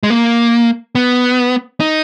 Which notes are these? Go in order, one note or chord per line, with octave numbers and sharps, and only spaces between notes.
G#3
A#3
B3
D#4